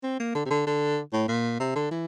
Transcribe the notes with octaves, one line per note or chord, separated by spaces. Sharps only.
C4
A#3
D3
C3
D3
D3
A2
A#2
C3
D3
E3